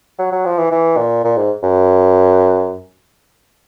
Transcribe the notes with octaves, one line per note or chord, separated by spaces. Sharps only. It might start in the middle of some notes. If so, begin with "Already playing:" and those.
F#3
F#3
F3
E3
E3
A#2
A#2
G#2
F#2